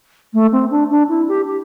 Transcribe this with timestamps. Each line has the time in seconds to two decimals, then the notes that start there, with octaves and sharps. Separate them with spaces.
0.33 A3
0.52 C4
0.70 D4
0.90 D4
1.08 E4
1.28 G4
1.46 G4